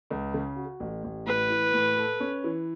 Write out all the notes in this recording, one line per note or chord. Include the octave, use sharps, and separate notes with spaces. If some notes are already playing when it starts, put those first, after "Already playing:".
C#2
C#3
F#4
A1
A1
A2 B4
E3
A2
A4
C#4
E3